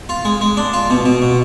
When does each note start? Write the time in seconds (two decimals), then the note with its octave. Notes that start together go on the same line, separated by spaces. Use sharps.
0.09 F4
0.25 G#3
0.41 G#3
0.57 D4
0.73 F4
0.90 B2
1.05 B2
1.22 B2